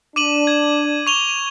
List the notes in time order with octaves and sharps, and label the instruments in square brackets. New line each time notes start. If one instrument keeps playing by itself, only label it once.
[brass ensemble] D4 [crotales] D6 D#7 F#7
[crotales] G#6
C#6 F7 G7